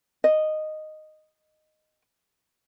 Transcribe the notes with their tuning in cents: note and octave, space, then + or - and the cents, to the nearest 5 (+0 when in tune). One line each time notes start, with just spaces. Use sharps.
D#5 -5